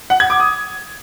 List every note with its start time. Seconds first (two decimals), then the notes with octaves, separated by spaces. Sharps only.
0.10 F#5
0.20 G#6
0.30 D6
0.40 D#6